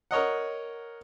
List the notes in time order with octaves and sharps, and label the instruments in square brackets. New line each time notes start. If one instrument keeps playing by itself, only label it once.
[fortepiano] A#4 C#5 D#5 F#5